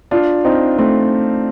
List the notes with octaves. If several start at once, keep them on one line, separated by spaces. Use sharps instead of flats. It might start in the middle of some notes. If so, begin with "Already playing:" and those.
D4 F4
C4 D#4
A3 C4